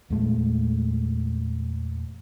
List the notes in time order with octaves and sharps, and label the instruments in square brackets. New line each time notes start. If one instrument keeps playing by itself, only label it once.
[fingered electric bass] E2 A#2 G#3 A3